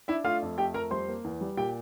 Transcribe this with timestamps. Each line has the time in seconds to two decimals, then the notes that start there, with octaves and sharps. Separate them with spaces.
0.08 D4 E4 E5
0.25 A3 F4 F5
0.42 F2
0.58 A3 G4 G5
0.74 F2 A#4 A#5
0.91 G3 C5 C6
1.08 A#3
1.24 E2
1.41 G3
1.57 A#2 G4 G5